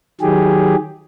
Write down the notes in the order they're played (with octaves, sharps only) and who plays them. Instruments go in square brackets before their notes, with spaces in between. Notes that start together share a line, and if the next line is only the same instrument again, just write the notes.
[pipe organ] D#3 F#3 G4 G#4